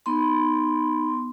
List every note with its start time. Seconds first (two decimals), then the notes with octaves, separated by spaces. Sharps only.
0.06 B3 D#4 B5 C6